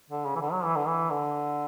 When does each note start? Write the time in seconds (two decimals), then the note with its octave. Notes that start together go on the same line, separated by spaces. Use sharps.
0.10 D3
0.25 C#3
0.35 E3
0.41 D3
0.52 F#3
0.64 E3
0.76 D3
0.88 E3
1.10 D3